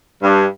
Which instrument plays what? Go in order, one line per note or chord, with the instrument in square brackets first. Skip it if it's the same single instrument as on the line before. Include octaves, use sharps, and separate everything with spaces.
[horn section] G2